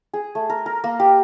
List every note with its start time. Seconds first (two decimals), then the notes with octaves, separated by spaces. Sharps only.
0.13 G#4
0.35 A3
0.50 A#4
0.66 A#4
0.84 A#3
1.00 G4